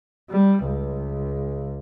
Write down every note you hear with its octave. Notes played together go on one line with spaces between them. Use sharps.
G3
C#2